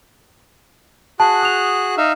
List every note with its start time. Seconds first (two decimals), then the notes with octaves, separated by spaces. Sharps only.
1.20 F#4 G#4 A5 F#6
1.43 D#6 F7
1.97 D#4 E5 F5